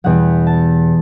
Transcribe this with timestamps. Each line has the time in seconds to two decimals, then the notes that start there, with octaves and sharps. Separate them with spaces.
0.04 E2 B2 G3 F#5
0.47 A5